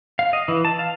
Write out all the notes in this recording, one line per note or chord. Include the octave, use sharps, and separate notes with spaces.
F5
D#5
E3
A5
F5